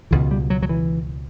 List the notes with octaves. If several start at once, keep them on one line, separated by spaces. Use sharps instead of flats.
C#2 B2 E3
G3
F#3
F#3
E3